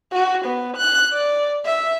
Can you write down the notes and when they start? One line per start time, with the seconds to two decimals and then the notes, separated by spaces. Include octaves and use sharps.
0.13 F#4
0.45 B3
0.76 F#6
1.12 D5
1.65 E5